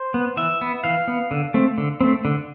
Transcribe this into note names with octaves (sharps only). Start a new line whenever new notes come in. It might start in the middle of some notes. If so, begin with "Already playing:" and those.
Already playing: C5
B3
E3 E5
B3
E3 F5
B3
D3
A3 C4
D3
A3 C4
D3